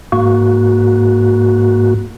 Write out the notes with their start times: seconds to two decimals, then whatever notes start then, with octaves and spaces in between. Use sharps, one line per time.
0.12 G#2 A#3 F#4